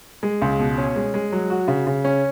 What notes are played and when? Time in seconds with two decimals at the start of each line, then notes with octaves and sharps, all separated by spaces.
0.23 G#3
0.42 C#2
0.59 B2
0.78 C#4
0.96 G#3
1.14 G#3
1.32 F#3
1.50 F#4
1.68 C#3
1.87 C#3
2.04 C#4